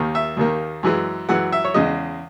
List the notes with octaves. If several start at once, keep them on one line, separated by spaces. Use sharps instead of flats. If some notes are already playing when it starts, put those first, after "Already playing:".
Already playing: D#2 D#3 A#3
E5
D#2 D#3 A#3
F#2 E3 G#3
F#2 E3 G#3 F#5
E5
C#5
E2 C#3 G#3 D#5